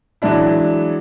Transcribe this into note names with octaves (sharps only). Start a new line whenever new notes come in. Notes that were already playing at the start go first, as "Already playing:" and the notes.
E3 F#3 G#3 D4 E4